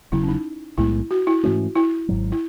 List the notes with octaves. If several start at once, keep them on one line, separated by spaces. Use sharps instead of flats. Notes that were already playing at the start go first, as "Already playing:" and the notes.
E1 E2 C#3 F#3 E4
C#4
D#4
B1 A2 G#3 B3 E4
F#4
E4
G#2 E3 A3 C#4 F#4
E4
G#1 G#2 F#3
E4